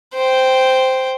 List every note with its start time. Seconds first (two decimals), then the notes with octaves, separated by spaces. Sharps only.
0.14 C5 G5